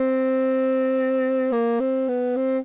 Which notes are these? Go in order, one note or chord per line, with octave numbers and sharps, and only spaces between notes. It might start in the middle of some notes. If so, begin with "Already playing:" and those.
Already playing: C4
A#3
C4
B3
C4